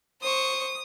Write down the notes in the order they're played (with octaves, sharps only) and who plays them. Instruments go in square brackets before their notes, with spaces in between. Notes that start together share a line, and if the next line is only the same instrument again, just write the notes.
[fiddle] C5 C#6 [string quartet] D#6